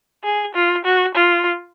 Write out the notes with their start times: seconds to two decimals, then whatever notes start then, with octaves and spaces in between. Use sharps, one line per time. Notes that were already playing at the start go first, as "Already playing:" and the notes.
0.24 G#4
0.55 F4
0.84 F#4
1.15 F4